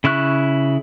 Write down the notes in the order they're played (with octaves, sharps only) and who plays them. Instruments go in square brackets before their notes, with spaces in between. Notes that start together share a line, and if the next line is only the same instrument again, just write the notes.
[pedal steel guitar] C#3 E4 C#6 F#6